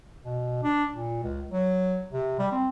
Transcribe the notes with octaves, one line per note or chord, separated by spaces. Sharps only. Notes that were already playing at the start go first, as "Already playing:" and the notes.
B2
D4
A#2
C#2
F#3
C3
G3
C4